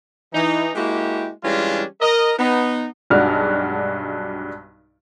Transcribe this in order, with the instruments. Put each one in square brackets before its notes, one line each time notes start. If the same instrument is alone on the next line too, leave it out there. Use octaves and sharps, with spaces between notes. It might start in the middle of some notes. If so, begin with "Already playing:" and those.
[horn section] E3 D#4
G#3 A#3 E4 F#4 G4
E3 G3 G#3 C#4 D4 F4
A#4 D#5
B3 D#4
[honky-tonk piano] B1 G2 G#3 D4 F#4 F6